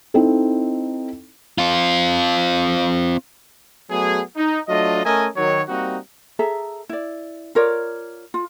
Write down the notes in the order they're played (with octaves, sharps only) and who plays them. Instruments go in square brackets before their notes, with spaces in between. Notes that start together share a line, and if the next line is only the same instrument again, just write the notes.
[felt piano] C4 D#4 E4 A4
[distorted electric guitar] C4 F4
[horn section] F#3 A3 B3 G#4
D#4
F#3 A3 D4 F4 D#5
A3 C#4 A#4 D#5 E5 G#5
D#3 F#3 C#5
G3 A#3 C4 D#4 F#4
[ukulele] G#4 A4 E5 A#5
E4 D5
F4 A#4 C#5 D5
F4